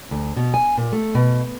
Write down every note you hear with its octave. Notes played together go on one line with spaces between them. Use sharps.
D2
B2
G#5
A#2
A3
B2